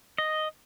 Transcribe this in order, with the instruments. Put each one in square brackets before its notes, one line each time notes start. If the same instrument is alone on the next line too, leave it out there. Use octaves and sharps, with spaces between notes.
[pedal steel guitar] D#5